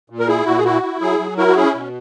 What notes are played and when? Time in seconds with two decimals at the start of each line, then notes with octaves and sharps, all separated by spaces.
0.10 A#2
0.19 A#4
0.28 E4 G#4
0.46 A#2 F#4
0.58 G#4
0.64 E4 F#4
0.83 E4
1.01 F#3 G#4
1.19 F#3
1.37 E4 F#4 A#4
1.47 F#4
1.56 C#4 G#4
1.74 B2